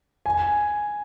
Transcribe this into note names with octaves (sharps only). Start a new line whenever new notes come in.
G#5